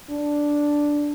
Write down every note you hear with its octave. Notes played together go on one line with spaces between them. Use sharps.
D4